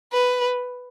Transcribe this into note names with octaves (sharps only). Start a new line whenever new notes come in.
B4